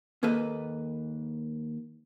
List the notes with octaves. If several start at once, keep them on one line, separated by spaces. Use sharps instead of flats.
D#2 A#3 A4 B4 D#5